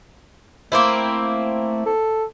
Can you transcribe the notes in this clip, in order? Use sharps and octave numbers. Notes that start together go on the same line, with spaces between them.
A3 A#3 C4 E4
A4